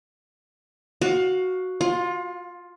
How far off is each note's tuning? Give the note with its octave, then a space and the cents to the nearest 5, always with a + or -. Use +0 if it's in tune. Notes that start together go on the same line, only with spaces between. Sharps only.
F#4 +0 F5 +20
F4 +10 F5 +35